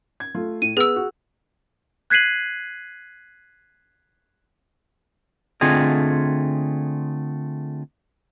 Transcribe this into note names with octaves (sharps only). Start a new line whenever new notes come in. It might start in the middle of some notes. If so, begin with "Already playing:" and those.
G#6
A3 F4
A2 D#7
B3 G#4 B4 E6 F6
F#4
F#6 G#6 B6 C7 D#7 F#7
D3 A3 C4 F4 G#4 D#5